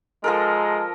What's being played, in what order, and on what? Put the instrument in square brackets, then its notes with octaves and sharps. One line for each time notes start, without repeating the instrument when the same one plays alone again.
[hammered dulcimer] F3 A4 A#4 [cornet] G#3